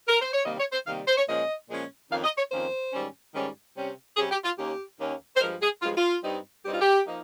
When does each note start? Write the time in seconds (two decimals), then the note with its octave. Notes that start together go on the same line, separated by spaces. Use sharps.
0.08 A#4
0.21 C5
0.34 C#5
0.45 C3 D#3 G3 A#3 D#5
0.59 C#5
0.73 C5
0.86 C3 D#3 G3 A#3 F5
1.07 C5
1.17 C#5
1.28 A#2 F3 G#3 C#4 D#5
1.68 A#2 F3 G#3 C#4
2.10 F2 D#3 A#3 C#4 F5
2.24 D#5
2.38 C#5
2.51 F2 D#3 A#3 C#4 C5
2.92 G#2 D#3 G3 C#4
3.34 G#2 D#3 G3 C#4
3.76 C3 G3 C#4
4.17 C3 G3 C#4 G#4
4.31 G4
4.44 F4
4.58 D#2 D#3 A#3 C#4 G4
4.99 D#2 D#3 A#3 C#4
5.36 C5
5.40 G2 F3 G#3 A#4
5.62 G#4
5.82 G2 F3 G#3 F4
5.96 F4
6.23 G2 G3 C4 D#4
6.64 G2 G3 C4 D#4 G4
6.73 F4
6.81 G4
7.06 F3 A#3 D#4